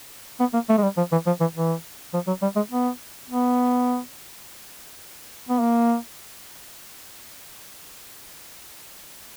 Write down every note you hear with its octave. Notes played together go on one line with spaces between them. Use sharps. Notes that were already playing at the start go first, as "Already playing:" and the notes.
B3
A#3
A3
G#3
G3
F3
E3
F3
E3
E3
F3
F#3
G3
G#3
B3
B3
B3
A#3